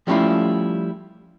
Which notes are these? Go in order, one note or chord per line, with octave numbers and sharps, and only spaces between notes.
F3 G3 A3 C#4 E4 F4